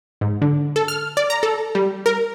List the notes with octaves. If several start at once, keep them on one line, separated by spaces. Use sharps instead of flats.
G#2
D3
A4
F6
D5
A#5
A4
G3
A#4